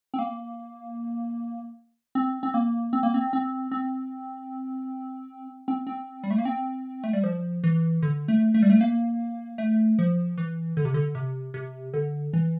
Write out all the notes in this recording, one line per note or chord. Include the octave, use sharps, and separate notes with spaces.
C4
A#3
C4
C4
A#3
C4
A#3
C4
C4
C4
C4
C4
G3
A3
A#3
C4
A3
G3
F3
E3
D3
A3
A3
G3
A3
A#3
A3
F3
E3
D3
C3
D3
C3
C3
D3
E3